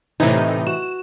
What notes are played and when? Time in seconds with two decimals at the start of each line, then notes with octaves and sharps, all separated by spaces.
0.20 A2 C3 E3 D#4
0.67 F#4 E7